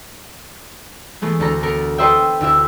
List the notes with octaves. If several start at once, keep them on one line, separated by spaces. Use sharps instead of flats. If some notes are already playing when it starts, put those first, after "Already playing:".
E3 G#3 A3 B3
D2 A4 A#5
B3 A4 A#4
A4 B4 C5 D#5 E5 G5
D2 E4 E5